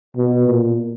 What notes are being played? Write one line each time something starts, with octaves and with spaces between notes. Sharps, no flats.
B2
A#2